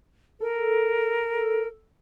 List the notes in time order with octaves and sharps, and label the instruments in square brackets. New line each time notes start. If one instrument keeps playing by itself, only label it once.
[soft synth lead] A4 [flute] A#4